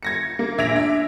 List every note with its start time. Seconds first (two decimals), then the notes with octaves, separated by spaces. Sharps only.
0.03 G#6 A#6 C#7
0.39 A#3
0.58 A#1 E5 G#6 A#6 D7 F7
0.75 D4 E5